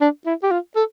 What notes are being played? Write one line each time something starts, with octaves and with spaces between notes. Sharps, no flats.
D4
E4
G4
F4
A4